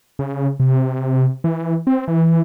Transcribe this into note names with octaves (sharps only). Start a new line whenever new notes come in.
C#3
C3
E3
C4
E3